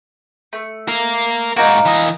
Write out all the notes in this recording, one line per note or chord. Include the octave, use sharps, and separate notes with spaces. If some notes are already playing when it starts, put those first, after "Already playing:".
A3
A#4 F5
G#2 A#3 D#4 F#4
E3 D#5